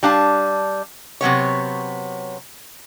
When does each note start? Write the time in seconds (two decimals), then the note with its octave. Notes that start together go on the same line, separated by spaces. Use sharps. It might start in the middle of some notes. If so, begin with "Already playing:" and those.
0.03 G3 D4 F5 A5
1.21 C3 F#3 B3 C#5